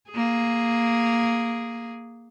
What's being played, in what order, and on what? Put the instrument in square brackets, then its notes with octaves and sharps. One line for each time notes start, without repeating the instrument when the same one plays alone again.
[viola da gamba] A#3 G#4